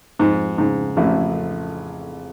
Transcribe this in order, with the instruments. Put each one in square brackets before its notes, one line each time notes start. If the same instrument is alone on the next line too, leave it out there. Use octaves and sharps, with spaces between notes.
[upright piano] F2 [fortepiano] G#2
[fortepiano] G#2 [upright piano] C#3
[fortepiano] A1 A2 [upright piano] F2